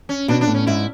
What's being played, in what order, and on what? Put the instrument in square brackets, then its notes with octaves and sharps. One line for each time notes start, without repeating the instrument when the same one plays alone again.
[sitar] C#4
[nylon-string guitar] B2 [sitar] D4
[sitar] D4
[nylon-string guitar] A2
[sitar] C#4
[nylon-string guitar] G#2 [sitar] E4